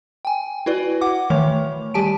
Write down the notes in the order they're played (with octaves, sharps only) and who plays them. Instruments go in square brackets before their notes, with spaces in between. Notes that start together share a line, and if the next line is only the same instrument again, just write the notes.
[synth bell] G5 G#5
E4 F#4 B4 D5
F#5 D6
D#3 E3 A3 C#5
G3 G4 G#5 A5 D7